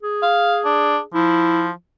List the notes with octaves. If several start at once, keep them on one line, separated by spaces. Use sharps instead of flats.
G#4
F5
D4
F3 E4